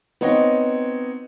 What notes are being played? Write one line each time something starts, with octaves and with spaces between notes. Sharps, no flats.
B3 C4 D#4 C#5 D#5